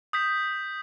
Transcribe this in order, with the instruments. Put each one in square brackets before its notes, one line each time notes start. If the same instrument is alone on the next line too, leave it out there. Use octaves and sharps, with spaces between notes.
[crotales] D#6 G6 B6